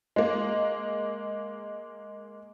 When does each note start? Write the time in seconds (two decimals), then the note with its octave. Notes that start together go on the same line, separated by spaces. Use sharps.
0.16 G#3 A#3